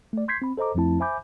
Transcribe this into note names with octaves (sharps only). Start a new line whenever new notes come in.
A3 D5
C6 G6 G#6 B6 C7
C4 B5
A4 C5 D#5 A#5 D6
F2 F3 A3 C4 E4 A5
C5 E5 G#5 B5 D6 G6